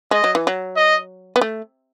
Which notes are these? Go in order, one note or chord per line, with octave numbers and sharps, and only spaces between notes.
G#3 D#5
F#3
E3
F#3
D#5
B3
A3